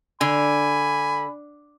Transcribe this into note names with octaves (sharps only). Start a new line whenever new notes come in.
D3 G#5 B5